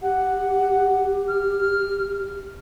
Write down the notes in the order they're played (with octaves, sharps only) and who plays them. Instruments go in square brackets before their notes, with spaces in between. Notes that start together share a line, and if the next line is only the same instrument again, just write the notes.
[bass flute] G4 [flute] F#5
[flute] F6